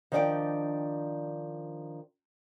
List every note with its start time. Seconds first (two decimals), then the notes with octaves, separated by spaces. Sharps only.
0.12 D#3 F3 D4 D5 F#5 G5